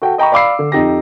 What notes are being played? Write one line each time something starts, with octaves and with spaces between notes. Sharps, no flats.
F#4 A4 G5
D#5 G5 A#5 B5 C#6
D5 F5 B5 D6 E6 C7
D3
F2 D#4 G4 A#6